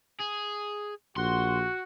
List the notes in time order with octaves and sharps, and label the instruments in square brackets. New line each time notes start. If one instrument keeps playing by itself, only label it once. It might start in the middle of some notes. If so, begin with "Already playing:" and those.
[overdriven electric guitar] G#4
[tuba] A#1 [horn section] F#4 [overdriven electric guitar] C6